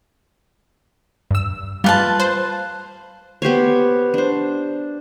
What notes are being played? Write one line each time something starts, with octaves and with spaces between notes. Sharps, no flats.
G2 E6
G3 F4 B4 A5
C5 C6
B3 G4 C5 C#5
D4 C5